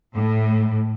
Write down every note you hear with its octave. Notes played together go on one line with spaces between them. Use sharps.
A2